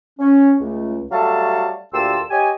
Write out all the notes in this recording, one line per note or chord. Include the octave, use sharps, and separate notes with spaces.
C#4
C#2 A3
F#3 G3 A3 A4 F5 A5
D2 A#2 G4 A5 C6 E6
G4 C#5 D#5 G#5